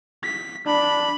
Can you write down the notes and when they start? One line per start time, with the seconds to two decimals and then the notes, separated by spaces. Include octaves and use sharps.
0.24 B6
0.66 D4 B5